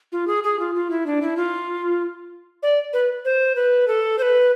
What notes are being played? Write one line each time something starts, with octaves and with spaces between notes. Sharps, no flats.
F4
G#4
G#4
F4
F4
E4
D4
E4
F4
D5
B4
C5
B4
A4
C5
B4